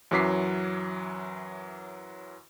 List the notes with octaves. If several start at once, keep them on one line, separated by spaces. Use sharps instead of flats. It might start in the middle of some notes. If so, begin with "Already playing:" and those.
F#2 E3 F#3 D6 B6 C7